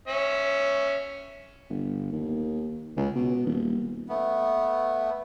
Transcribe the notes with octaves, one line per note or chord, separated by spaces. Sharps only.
C#4 E5
G1
D#2
C#2
B2
D#1
A3 B3